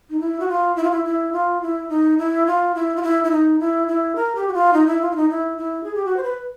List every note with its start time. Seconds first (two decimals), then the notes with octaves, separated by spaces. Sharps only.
0.10 D#4
0.20 E4
0.40 F#4
0.49 F4
0.76 E4
0.84 F4
0.91 E4
1.05 E4
1.33 F4
1.62 E4
1.89 D#4
2.19 E4
2.47 F4
2.75 E4
2.96 F4
3.03 E4
3.24 E4
3.32 D#4
3.60 E4
3.88 E4
4.16 A#4
4.35 G4
4.48 F#4
4.54 F4
4.73 D#4
4.87 E4
5.02 F4
5.11 E4
5.16 D#4
5.30 E4
5.58 E4
5.84 G#4
5.95 G4
6.05 F#4
6.17 C5
6.23 B4